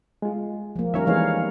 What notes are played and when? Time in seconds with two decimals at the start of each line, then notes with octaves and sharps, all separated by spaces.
0.22 G#3 F4
0.76 F3 A#3
0.94 D#3 G3 C#4 A#4 C#5 E5
1.07 E3 G#3 B3 C#4 C#5 F5